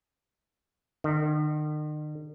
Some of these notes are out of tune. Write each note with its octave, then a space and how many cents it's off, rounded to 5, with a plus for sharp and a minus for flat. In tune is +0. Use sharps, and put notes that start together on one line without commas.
D#3 -45